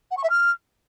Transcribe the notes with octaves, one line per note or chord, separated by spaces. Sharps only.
F#5
C#6
E5
F6